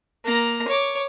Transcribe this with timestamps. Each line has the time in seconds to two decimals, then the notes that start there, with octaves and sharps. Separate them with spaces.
0.25 A#3 A#5
0.68 C#5 D6